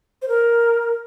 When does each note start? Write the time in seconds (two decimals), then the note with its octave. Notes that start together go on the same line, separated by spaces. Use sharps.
0.22 C5
0.28 A#4